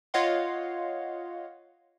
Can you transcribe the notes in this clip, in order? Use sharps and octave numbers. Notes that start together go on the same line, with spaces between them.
F4 C#5 D#5 F5 F#5 C6